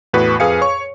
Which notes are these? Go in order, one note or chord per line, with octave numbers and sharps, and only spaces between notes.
E2 A2 F#4 B4
F2 G#4 B4 F5 G#5 C#7
C#5 C#6